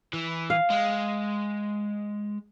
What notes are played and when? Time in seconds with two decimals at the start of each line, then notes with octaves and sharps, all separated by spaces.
0.13 E3
0.50 F5
0.70 G#3